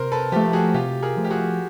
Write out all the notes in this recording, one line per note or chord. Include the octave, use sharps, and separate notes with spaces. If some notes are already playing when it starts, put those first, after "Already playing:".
Already playing: C3 A#4 C5
A4 B4
F3 A3 G4 A4
F#4 G#4
C3 F4 G4
G#4 A#4
F3 A3
G4
F#4 G#4